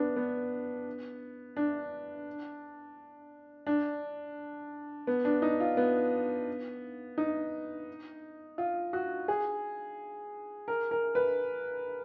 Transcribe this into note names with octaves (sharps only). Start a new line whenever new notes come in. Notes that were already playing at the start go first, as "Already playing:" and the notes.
Already playing: B3 D4
B3
D4
D4
B3
D4
D#4
F4
B3
D#4
F4
F#4
G#4
A#4
A#4
B4